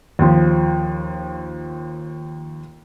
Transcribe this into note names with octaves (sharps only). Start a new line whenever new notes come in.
D#2 F3